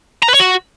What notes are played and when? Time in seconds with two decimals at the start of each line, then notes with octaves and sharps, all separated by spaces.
0.23 A#5
0.28 B4
0.34 C#5
0.40 F#4